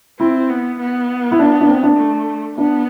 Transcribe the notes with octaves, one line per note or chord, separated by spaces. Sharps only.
C4 E4
B3
B3
E4
D4
D4
C4
D4
A3
B3 D4